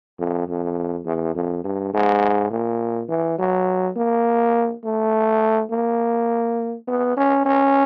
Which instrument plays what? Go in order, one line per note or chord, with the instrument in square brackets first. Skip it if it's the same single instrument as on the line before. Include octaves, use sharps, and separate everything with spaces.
[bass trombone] F2
F2
E2
F2
G2
G#2
A#2
E3
F#3
A#3
A3
A#3
B3
C#4
C#4